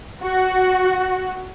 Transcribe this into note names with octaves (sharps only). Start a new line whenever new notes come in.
F#4